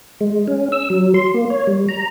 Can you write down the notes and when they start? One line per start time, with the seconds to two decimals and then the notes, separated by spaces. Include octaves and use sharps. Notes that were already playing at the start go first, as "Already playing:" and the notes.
0.21 G#3
0.48 C#4
0.72 E6
0.90 F#3
1.14 C6
1.34 A#3
1.50 C#5
1.67 G3
1.89 A#5